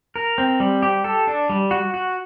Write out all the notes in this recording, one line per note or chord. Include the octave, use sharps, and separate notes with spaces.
A#4
C4
G3
G4
A4
D4
G3
F#4
F#4